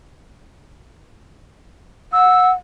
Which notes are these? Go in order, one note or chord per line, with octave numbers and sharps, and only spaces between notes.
F#5 E6